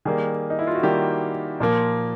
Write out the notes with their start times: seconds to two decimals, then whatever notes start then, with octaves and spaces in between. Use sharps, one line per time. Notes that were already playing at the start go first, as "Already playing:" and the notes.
0.05 D#3 G3 A#3 G#4
0.50 D#4
0.59 E4
0.67 F4
0.75 F#4
0.83 D#3 G3 A#3 G4
1.60 A#2 F3 A#3